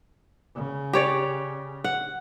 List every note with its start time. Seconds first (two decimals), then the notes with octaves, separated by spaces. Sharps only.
0.55 C#3
0.93 G4 C#5 D5
1.84 F#5